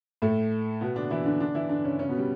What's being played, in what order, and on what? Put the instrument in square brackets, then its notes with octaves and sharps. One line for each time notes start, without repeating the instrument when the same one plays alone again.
[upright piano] A2 A3
B2 B3
D3 D4
E3 E4
D3 D4
D3 D4
E3 E4
D3 D4
C#3 C#4
C#3 C#4
B2 B3
G3